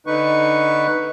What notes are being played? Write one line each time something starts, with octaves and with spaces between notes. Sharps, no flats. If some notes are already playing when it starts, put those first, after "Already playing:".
D3 D#4 B4 C#6